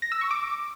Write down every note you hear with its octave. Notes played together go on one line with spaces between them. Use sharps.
A#6
E6
C#6
D6